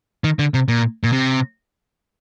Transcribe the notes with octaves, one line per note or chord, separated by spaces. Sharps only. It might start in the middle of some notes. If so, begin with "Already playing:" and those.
D#3
D3
C3
A#2
A#2
C3